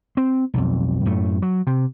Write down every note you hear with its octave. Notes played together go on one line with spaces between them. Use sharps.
C4
B1 F2
F#2 A2 A3
F#3
C3